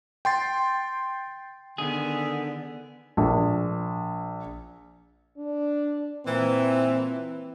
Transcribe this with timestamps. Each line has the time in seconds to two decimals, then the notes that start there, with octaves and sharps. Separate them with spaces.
0.25 G5 C6 A6
1.78 D3 D#3 B3 G#4
3.17 A#1
5.38 D4
6.26 A#2 E3 C4